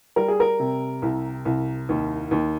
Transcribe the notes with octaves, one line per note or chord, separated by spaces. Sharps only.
G3 A#4
G#4
A#4
C3
C2
C2
D#2
D#2